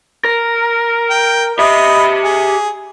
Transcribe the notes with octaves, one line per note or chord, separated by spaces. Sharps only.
A#4
G5
G4 D#5 E5 B5
G#4